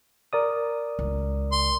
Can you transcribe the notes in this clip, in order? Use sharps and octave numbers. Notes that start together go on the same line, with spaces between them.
A#4 D5 D#6
C#2
C6